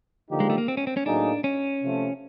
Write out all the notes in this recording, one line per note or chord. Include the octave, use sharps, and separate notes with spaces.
D3 F3 A#3 D#4 G4
G#3
A3
A#3
C4
C#4
C4
C#4
A2 F#3 A#3 D4 D#4 G#4
C#4
C3 F3 A3